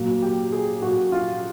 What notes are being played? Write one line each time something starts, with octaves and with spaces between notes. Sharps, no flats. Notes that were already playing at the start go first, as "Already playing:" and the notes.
Already playing: A#2 F#3 A#3
G4
G#4
A#2 F#3 A#3 F#4
F4